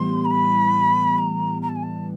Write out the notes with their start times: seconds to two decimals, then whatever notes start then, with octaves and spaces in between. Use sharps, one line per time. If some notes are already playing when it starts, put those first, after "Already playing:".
Already playing: A2 E3 G3 B3 C6
0.25 A#5
0.31 B5
1.18 A#5
1.62 A#5
1.69 A5
1.76 G#5
1.83 A5